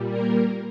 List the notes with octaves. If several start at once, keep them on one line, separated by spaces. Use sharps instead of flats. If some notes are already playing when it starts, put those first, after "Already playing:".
Already playing: A#2 G3
A#3 A#4